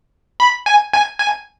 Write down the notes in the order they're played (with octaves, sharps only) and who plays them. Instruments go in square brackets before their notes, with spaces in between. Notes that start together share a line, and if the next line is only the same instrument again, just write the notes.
[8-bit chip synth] B5
G#5
G#5
G#5